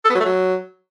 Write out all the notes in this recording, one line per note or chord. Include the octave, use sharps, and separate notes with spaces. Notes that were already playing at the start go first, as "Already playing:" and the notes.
A4
B3
F#3
A3
F#3